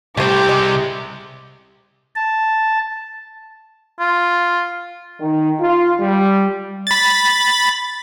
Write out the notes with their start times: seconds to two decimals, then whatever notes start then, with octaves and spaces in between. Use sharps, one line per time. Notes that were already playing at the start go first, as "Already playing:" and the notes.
0.17 C2 C3 A3 G4 C5 D6
0.49 G#3
2.16 A5
4.00 F4
5.21 D#3
5.61 F4
6.01 G3
6.87 B5 A6